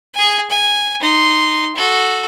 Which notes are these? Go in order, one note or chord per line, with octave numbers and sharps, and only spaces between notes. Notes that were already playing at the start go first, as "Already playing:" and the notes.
G#4 G#5
G#5
D#4 C6
F#4 A4